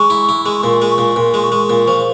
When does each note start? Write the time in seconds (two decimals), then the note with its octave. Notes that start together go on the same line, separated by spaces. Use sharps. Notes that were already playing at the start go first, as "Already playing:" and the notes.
Already playing: G#3 C#6
0.10 E4
0.29 E4
0.46 G#3
0.58 C#6
0.63 A#2 C6
0.82 G#3
0.91 C#6
0.98 A#2
1.16 A#2 C6
1.34 G#3 C6
1.42 C#6
1.52 G#3
1.70 A#2
1.86 F3 C#6